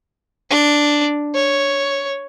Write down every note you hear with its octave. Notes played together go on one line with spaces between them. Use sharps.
D4
C#5